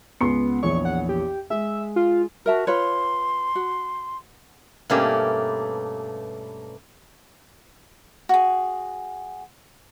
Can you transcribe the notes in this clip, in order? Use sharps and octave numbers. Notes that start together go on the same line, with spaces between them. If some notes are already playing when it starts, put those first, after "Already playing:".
C#2 B3 C6 C#7
A#1 E2 C#5 C#6
F#5
G4
G#3 E5
F4
F#4 A#4 E5 A5
F4 B4 C#5 C6
F#4
G2 B2 A3 A#3 C#4 G4
F#4 G#4